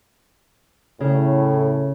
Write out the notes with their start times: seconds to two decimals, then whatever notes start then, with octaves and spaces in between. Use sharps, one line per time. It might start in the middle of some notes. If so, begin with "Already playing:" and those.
1.00 A2 C#3